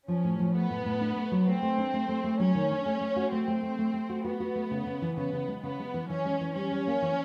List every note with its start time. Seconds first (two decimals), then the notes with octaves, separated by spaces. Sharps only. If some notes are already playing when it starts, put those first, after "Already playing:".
0.08 F3 C#4
0.24 A2
0.39 F3
0.54 A3 B3
0.70 A2
0.85 A2
1.01 D4
1.16 A3
1.32 F#3
1.47 A3 C4
1.62 A3
1.78 D4
1.94 A3
2.09 A3
2.24 A3
2.39 F#3 C#4
2.55 D#3
2.71 D4
2.86 A3
3.01 A3
3.16 F#4
3.32 A3 C4
3.48 A3
3.63 A3
3.79 A3
3.94 A3
4.09 F#4
4.24 B3 F#4
4.40 F#4
4.55 A3
4.71 C#3
4.86 C#3
5.02 E3
5.17 C#3 B3
5.33 C#3
5.48 G#3
5.63 C#3 B3
5.79 G#3
5.94 E3
6.09 E3 C#4
6.25 G#3
6.41 E3
6.55 G3 C#4
6.71 G3
6.87 A#3
7.02 E3